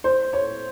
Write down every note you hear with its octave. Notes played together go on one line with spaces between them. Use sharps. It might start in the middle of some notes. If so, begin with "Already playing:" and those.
C5
C#5